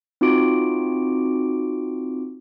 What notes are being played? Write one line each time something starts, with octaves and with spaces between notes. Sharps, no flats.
C4 D#4 F4 F#4 D6 D7